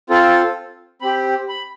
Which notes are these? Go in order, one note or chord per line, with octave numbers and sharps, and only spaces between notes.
C4 F4 A4
C4 G4 B5
B5